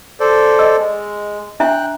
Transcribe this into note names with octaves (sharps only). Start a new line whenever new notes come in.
A4 C5 D5
D#5 E6
G#3
D4 E5 G5 A#5 F#6